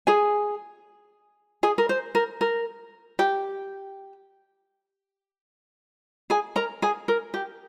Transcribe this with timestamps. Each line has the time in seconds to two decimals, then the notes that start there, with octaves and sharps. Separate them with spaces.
0.07 G#4 G#5
1.63 G#4 G#5
1.78 A#4
1.89 C5
2.15 A#4
2.41 A#4
3.19 G4 G5
6.30 G#4 G#5
6.56 A#4 A#5
6.82 G#4 G#5
7.08 A#4
7.34 G4